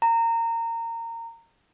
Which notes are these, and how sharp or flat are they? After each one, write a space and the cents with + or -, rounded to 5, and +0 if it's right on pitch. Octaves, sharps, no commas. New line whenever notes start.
A#5 -25